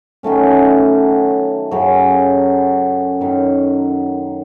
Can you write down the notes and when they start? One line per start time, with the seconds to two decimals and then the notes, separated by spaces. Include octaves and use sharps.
0.23 D#3 F#3 A3 C#4
1.71 F#2 C#3 F#3
3.21 F#2 D#3 F#3